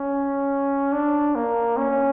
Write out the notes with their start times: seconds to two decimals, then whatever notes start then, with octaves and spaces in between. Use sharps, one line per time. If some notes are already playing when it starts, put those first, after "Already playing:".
Already playing: C#4
0.92 D4
1.35 A#3
1.77 C#4